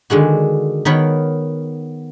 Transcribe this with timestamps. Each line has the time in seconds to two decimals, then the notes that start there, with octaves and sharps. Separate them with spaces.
0.10 D3 D#3 G#3 F#4
0.85 D#3 B3 A#4 C#5 B5